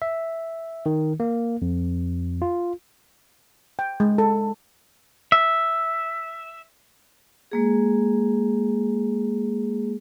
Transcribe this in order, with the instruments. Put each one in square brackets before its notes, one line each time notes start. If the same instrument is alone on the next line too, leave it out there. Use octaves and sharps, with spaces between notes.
[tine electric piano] E5
D#3
A#3
F2
F4
[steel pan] G5
G#3
A4
[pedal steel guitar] E5
[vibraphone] G#3 A#3 G#4